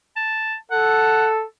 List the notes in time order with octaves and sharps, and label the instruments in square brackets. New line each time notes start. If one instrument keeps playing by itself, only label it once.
[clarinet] A5
[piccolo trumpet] A4 [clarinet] F#5